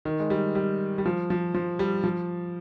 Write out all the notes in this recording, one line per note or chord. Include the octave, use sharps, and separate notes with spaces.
D#3
G#3
G3
G3
G3
F3
F3
F3
G3
F3